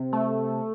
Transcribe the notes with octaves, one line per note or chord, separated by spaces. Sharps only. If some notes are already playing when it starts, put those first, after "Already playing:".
Already playing: C3
A3